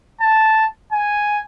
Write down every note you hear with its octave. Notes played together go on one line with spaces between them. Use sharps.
A5
G#5